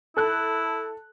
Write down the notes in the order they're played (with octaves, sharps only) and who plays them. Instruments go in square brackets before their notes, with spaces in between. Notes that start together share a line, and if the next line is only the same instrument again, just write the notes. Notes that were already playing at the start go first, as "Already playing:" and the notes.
[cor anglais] E4 [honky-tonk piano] A4 F#6